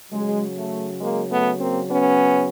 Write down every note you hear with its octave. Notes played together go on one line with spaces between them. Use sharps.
C#3 F#3 G#3
A3
G#3 A#3
A3 B3
A#3 C4
B3 C#4